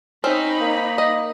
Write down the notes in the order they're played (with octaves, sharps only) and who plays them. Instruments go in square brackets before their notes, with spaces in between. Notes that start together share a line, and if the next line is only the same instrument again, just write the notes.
[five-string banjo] C4 C#4 [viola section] D#4 B5
[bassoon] A#3
[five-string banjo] D#5